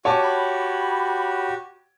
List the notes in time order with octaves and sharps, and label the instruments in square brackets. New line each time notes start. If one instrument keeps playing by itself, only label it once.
[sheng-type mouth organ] F#4 G4 [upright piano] C#5 A5 D6 [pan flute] G#5
[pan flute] B5